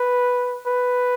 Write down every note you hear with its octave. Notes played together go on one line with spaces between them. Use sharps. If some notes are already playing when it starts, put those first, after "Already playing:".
Already playing: B4
B4